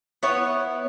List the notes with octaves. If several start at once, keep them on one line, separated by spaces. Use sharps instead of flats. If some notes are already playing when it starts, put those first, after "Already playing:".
B3 E4 C#5